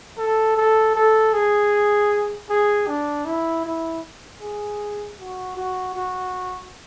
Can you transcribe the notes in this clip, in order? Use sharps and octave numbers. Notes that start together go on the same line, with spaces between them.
A4
A4
A4
G#4
G#4
D4
E4
E4
G#4
F#4
F#4
F#4